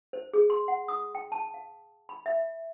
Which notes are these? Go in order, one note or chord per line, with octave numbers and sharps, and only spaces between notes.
C5
G#4
C6
F#5
D#6
G5
A5
F5
B5
E5